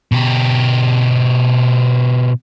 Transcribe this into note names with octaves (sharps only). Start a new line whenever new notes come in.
B2 G4